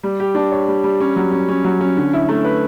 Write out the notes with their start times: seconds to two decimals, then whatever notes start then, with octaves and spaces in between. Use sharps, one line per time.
0.03 G3
0.20 G4
0.35 D4
0.52 C#5
0.68 G3
0.84 G3
1.00 C#4
1.16 F#3
1.32 C#4
1.49 C#4
1.65 F#3
1.81 C#4
1.97 D3
2.13 E4
2.29 A3
2.44 B4